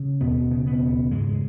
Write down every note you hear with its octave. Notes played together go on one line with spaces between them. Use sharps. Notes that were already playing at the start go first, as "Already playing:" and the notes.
Already playing: C#3
D#2 B2 B3
C#3
B2 B3
D#2
G#2 C#3 G#3